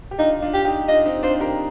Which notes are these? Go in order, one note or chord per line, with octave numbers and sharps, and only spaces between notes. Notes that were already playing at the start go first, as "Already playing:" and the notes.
G4
D4 D#4 F4
D4 F4
G4
D#4 G4
D4 F4 D#5
C4 D#4
D4 F4 C5
G4 A#4